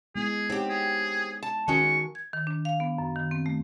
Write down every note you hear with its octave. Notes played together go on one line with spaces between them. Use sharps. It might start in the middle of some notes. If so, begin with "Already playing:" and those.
G#3 B3 E4 G#4
C4 D#4 G4 C#5 F#5
G#4
A5
D#3 G#3 C#4 F#4 A#4 C#6
G#6
D#3
D4
F5
B3
F#2
D#3
C4
A3